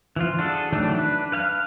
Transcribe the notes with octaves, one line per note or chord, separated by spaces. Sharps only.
E3 F3 F4
D4 F#4 G#4 A4
D#3 E3 F#3 A3 D4
D4 B4
B4 F5 G5 F6